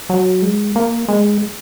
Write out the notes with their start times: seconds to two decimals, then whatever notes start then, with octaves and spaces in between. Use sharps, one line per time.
0.09 F#3
0.42 G#3
0.76 A#3
1.08 G#3